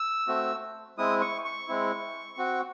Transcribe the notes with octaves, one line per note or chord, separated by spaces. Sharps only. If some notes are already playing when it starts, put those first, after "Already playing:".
Already playing: E6
A3 C4 F#4
G#3 C4 E4 D#6
C#6
C#6
G#3 C4 E4
C4 F#4